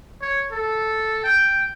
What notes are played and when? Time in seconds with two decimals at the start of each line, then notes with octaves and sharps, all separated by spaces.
0.22 C#5
0.52 A4
1.24 G5